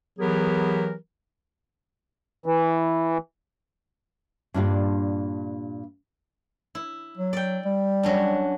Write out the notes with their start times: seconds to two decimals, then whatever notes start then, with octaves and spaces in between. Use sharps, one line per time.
0.19 E3 F#3 B3 G4 G#4 A#4
2.46 E3
4.54 G2 A#2 D4 F4 G4 F5
6.75 E4
7.17 F#3
7.33 D5 G5
7.65 G3
8.03 F#3 C#4 D4